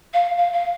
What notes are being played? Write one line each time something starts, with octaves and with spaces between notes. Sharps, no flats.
F5
F5
F5